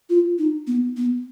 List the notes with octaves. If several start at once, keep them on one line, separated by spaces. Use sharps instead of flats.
F4
D#4
B3
B3